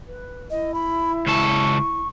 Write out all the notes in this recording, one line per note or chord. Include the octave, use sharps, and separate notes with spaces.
B4
E4 D#5
B5
C#2 A4 C#6